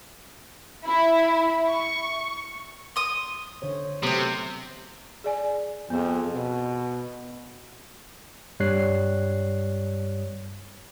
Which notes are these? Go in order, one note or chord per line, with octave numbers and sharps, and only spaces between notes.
E4
C#6
C6 D#6
D3 C5 C#5
C3 F#3 A3 B3 C4 D#6
G#4 D5 G#5
F2 B3 G#4
B2
G2 G3 C#5 F#6 C7